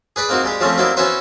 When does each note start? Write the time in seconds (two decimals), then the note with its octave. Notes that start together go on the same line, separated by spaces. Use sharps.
0.16 G#4 B4 D5 B5
0.29 A#3 C4 D#4 F#4
0.44 G3 G#3 G4
0.60 F3 G3 A3 C4 C#4
0.77 F#3 G3 A#3 C4 D#4 E4
0.97 B3 C#4 E4 F#4 B4 C5